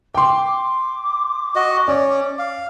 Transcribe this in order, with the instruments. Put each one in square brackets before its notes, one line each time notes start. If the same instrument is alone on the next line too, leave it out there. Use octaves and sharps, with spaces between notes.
[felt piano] G5 C6 [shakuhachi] D6
[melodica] F#4 D#5
[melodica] C#4 [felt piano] D5
[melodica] F5